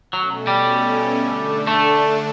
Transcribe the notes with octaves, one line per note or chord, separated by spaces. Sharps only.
B2 F#3 A3 C#4
G3
D3 A3 D4
A3